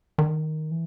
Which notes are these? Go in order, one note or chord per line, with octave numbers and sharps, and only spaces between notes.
D#3
E3